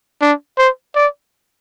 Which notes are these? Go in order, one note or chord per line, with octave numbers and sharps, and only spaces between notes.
D4
C5
D5